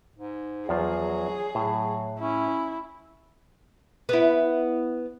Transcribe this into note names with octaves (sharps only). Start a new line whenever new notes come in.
G#2
E2 F3 F#3 F4 G#4
A2 F#3
C#4 E4
B3 E4